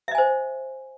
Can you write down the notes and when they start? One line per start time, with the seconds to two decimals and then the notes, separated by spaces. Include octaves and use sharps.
0.08 E5
0.11 D#5
0.15 G#5
0.18 C5